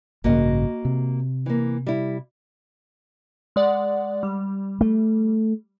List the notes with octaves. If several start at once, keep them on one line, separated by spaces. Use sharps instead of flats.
A1 G2 C#3 A#3 F#4 D#5
C3
E3 A#3
G3 E4
G#3 D5 F#5
G3
A3